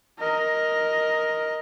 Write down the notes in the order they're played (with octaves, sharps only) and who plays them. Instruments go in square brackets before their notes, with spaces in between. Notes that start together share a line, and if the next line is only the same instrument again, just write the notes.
[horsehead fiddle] A#4 D#5